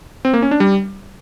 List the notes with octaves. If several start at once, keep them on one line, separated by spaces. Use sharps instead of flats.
C4
A#3
C#4
D4
G3